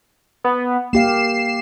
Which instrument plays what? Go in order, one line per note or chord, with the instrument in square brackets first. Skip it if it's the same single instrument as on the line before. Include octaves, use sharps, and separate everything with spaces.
[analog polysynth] B3
[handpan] A#3 G4 F5 [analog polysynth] C7 E7